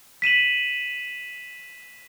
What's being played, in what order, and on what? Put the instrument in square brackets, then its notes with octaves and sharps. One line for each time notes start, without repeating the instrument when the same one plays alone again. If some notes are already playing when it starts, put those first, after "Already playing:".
[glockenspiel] B6 D#7 E7 F#7